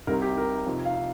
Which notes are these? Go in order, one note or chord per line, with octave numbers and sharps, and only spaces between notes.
C2 C3 G3 D#4 A#4
G4
A#4
F2 C3 F3 D#4
F5